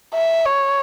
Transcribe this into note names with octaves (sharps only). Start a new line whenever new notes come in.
E5
C#5